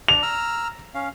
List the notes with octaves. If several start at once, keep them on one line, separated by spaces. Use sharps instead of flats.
D4 F7
A#5 E6 F6
C#4 F5